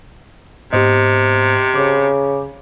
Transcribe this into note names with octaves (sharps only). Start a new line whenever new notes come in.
G#2 C3 B3 G4 C5 D#5
C#3 D6